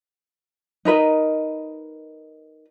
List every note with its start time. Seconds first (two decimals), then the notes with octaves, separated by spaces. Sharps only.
0.85 D#4 A#4 B4 D#5